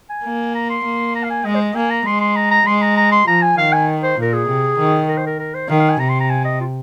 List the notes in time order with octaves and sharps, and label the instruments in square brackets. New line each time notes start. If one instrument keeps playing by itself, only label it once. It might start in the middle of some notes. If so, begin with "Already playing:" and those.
[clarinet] G#5
[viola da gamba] A#3
[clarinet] A#5
C6
[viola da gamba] A#3
[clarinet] A#5
F5
G#5
[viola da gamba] G#3 [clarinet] D#5
[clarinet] C5
D#5
[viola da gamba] A#3 [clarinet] G#5
[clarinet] A#5
[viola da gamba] G#3 [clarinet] C6
[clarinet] C6
A#5
A#5
[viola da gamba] G#3 [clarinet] C6
[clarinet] A#5
A#5
C6
[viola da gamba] F3 [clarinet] A#5
[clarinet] G#5
[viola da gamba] D#3 [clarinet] F5
[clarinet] G#5
C5
[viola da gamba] A#2 [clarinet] A#4
[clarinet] G#4
[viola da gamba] C3
D#3
[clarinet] A#4
C5
A#4
A#4
C5
[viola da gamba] D#3 [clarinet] F5
[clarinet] F5
G#5
[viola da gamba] C3 [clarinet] A#5
[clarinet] C6
A#5
G#5
D#5
F4